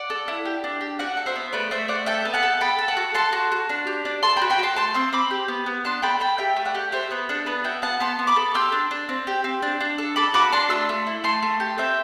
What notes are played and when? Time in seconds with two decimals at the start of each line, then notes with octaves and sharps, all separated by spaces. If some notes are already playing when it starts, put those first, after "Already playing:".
Already playing: D5 F#5
0.10 A4
0.28 E4
0.45 G4
0.64 D4
0.81 G4
0.99 F#4 D5 F#5
1.17 A4
1.26 C5 E5
1.36 B3
1.53 A3 B4 D5
1.71 A3 C5 E5
1.88 A3 D5 F#5
2.06 A4 E5 G5
2.25 B3
2.34 F#5 A5
2.43 A4
2.61 A4 G5 B5
2.79 A4
2.88 F#5 A5
2.97 F#4
3.14 A4 A5 C6
3.33 F#4
3.52 F#4
3.69 D4
3.87 G4
4.05 D4
4.23 A4 A5 C6
4.37 G5 B5
4.42 F#4
4.50 G5 B5
4.59 F#4 A5 C6
4.76 A3 A5 C6
4.94 C4 C6 E6
5.13 C4 B5 D6
5.31 G4
5.48 B3
5.66 B3
5.84 D4 A5 C6
6.02 A4 G5 B5
6.20 A4 G5 B5
6.38 G4 E5 G5
6.56 A3
6.65 D5 F#5
6.75 G4
6.92 G4 C5 E5
7.11 B3 B4
7.29 D4 A4
7.46 B3 B4
7.64 F#4 E5 G5
7.82 B3 F#5 A5
8.00 B3 A5 C6
8.19 B3
8.27 B5 D6
8.36 A4
8.54 G4 C6 E6
8.72 D4
8.91 D4
9.09 C4
9.27 G4
9.44 C4
9.62 D4
9.80 D4
9.98 A4
10.16 A4 B5 D6
10.34 F#4 B5 D6
10.52 D4 A5 C6
10.70 A3 C6 E6
10.89 A3
11.07 E4
11.24 A3 A5 C6
11.43 A3
11.60 G4
11.78 C4 E5 G5